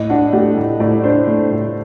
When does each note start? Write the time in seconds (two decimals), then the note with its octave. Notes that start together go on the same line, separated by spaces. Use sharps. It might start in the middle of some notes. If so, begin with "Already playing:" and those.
Already playing: A2 D#5
0.10 D4 F#5
0.33 A3 G4
0.57 A2
0.80 A2 D5
1.04 D4 C5
1.27 A3
1.52 A2